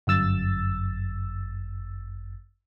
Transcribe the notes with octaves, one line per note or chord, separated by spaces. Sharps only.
G1 F#2 E6 A6